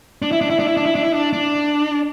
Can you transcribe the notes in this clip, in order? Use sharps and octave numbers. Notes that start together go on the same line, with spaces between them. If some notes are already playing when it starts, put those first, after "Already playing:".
D4
E4
D4
E4
D4
E4
D4
E4
D4
E4
D4
D4